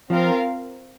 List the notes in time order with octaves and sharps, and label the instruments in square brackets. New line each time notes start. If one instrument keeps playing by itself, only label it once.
[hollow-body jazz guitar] F3 [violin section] C4 F4 A#4 F5